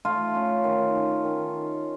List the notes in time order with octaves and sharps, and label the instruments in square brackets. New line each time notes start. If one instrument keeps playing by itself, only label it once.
[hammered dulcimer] A3 F4
C#4
D#3
C#4
D#3